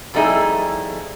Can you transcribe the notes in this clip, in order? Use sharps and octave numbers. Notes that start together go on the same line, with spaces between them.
F2 G3 A3 D#4 E4 G#4